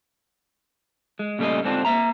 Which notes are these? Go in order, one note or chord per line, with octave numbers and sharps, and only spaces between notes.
G#3
A#2 C#3 G3 A3 G#4 D#5
G#2 D3 C4 D4 F4
A#3 E5 A#5